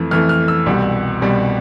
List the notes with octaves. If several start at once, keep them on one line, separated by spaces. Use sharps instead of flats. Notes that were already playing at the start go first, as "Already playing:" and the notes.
Already playing: F2 E3 A3
F2 E3 A3 F6
F6
E6
C2 B2 G3
C2 B2 G3